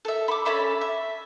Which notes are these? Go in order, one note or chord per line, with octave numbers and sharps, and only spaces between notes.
A4 E5
B5 D6
C#4 A4 E5 B5
E5